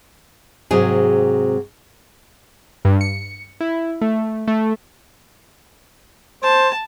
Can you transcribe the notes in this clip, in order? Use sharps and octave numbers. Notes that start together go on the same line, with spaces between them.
G#2 C3 F#3 G#4
G2
C#7
E4
A3
A3
C5 A5